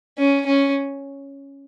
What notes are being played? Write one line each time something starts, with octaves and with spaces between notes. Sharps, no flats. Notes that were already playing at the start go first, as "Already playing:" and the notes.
C#4
C#4